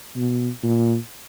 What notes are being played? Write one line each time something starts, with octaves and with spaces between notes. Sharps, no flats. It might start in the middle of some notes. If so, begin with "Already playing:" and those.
B2
A#2